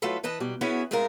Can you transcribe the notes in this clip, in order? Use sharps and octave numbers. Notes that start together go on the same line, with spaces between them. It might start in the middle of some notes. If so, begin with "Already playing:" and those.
F#3 A3 E4 F4 A4 B4
E3 B4 D#5 A5
B2 F#3 G3
B3 C#4 E4 F#4 G#4 B4
A2 G#3 A3 C4 F4 A#4